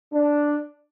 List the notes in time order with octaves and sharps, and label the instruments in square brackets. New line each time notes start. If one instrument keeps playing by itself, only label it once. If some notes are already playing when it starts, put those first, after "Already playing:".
[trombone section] D4